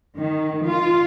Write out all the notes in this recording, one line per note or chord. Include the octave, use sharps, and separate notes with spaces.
D#3
F4